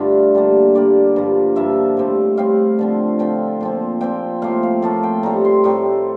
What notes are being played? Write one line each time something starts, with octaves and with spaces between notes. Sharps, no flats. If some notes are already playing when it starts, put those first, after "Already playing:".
Already playing: G2 D3 A3 D4 F4
D3 G3 A#3
D3 G3 A#3 D5
G2 F3 A#3
G2 F3 A#3 E5
A2 G3 C4
A2 G3 C4 F5
D3 F3 C4
D3 F3 C4 G5
A#2 F3 C4
A#2 F3 C4 G5
A2 F3 A#3 F5
F5
A2 F3 A#3 A5
G5
A2 G3 C4 A#5
C6
A2 G3 C4 A#5